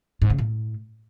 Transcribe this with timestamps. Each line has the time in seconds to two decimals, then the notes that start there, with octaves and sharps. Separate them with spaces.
0.22 G#2
0.30 C#3
0.38 A2